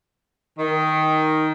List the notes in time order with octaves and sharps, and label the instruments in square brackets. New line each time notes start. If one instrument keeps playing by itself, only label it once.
[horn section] D#3